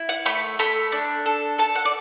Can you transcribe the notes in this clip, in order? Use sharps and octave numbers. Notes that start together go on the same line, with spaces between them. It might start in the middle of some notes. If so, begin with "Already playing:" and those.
Already playing: E4
F#5
A3 B5
A3 B5
D4
A4
A4 A5
F#5
D5